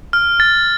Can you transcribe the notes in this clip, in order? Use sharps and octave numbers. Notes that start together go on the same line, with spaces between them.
F6
A6